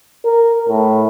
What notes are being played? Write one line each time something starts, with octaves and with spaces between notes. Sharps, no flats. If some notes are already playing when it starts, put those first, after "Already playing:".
A#4
A2